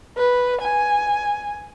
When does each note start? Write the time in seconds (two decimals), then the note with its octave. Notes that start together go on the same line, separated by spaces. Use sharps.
0.17 B4
0.61 G#5